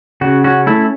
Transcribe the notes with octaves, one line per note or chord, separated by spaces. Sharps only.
C#3 F#4
C#4 F#4
A3 E4